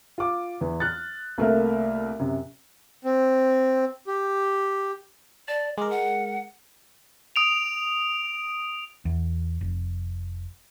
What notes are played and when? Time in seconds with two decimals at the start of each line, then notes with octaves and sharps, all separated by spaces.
0.18 F4 D6
0.61 E2 E3
0.80 F6 F#6 A6
1.38 C2 A3 A#3 A4 A#4 E5
2.19 F#2 C3
3.04 C4
4.07 G4
5.48 D5 A5
5.78 G#3 A#4 D6
5.90 F#5
7.36 D#6 D7 F7
9.05 E2
9.61 F1